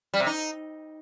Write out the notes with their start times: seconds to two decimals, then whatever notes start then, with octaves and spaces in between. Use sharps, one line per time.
0.14 G3
0.20 C3
0.26 D#4